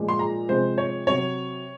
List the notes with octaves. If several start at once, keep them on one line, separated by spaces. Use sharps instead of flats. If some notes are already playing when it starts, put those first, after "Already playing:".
Already playing: A#2 F3 G#3
C6
A#5
C3 F3 G#3 C5
C#5
C3 F#3 C#5